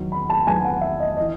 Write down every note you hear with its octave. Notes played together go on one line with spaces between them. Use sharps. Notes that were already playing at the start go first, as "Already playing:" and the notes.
Already playing: E2 D#3 F#3
B5
A5
E2 D#3 F#3 G#5
F#5
E5
D#5
E3 D#5